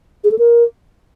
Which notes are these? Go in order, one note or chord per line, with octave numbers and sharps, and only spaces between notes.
G#4
A4
A#4